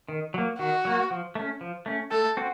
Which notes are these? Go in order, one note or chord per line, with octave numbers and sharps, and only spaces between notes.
D#3
F#3 A#3
D#3 F#4
F#3 A#3
F3
A3 C#4
F3
A3 C#4
A3 A4
C4 F#4